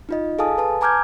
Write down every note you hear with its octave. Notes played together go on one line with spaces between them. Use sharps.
D#4 F4 D#5
G#4 A4 F5 G#5 A5 D#6
B4 A5
G#5 A#5 D6 F6 G6 G#6